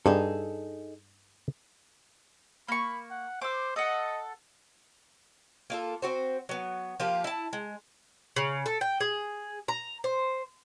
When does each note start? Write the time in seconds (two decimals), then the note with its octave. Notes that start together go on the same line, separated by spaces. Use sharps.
0.06 G2 D#4 G#4 A4
2.68 A#3 B5 C#6
3.10 F#5
3.42 C5 D6 E6
3.76 A4 D#5 F#5
5.70 A#3 F4 A4
6.02 C4 F#4 C5
6.49 F#3 B3
7.00 F3 A#3 F4 G4
7.24 E4 A5
7.53 G#3
8.36 C#3
8.66 A4
8.81 G5
9.00 G#4
9.68 A#5
10.04 C5